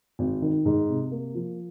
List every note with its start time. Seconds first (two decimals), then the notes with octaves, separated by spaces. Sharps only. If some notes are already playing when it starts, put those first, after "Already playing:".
0.19 G#1
0.42 D#3
0.65 G#2
0.89 C3
1.11 A#3
1.35 F3